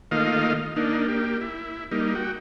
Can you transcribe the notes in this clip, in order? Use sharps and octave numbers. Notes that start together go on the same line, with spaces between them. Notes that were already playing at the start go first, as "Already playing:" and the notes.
D#3 A3 A#3 F4 D#5 F5
A#3 D4 D#4
A#3 G4
E4
G3 A#3 D#4
F#4 G5